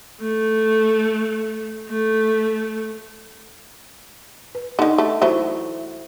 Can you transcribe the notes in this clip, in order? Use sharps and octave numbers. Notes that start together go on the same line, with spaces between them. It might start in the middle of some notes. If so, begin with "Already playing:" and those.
A3
A3
B4
D3 D#3 D#4
A3
E3 F#3 A3 E4 C5